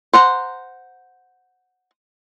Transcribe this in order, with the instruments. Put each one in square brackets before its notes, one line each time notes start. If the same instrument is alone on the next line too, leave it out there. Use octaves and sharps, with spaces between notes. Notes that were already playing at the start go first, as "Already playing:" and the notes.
[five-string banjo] C5 F#5 A#5